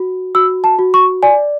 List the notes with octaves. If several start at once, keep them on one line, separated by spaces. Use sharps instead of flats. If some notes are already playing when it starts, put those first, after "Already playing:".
Already playing: F#4
F#4 E6
A5
F#4
C#6
D5 G#5